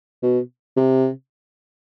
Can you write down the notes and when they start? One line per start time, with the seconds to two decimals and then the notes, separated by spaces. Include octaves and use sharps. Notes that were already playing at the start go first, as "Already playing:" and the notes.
0.23 B2
0.77 C3